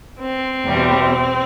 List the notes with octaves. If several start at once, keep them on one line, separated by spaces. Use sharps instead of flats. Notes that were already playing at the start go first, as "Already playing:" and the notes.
C4
E2 B2 G3